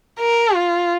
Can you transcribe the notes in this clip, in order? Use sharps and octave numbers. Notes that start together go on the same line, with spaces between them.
A#4
F4